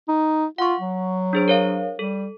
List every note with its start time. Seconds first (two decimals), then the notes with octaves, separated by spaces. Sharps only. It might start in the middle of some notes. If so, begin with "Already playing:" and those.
0.08 D#4
0.58 F4 F#5 C#6
0.80 F#3
1.33 D4 G#4 C5
1.48 A#4 C#5 F5
1.99 G3 A4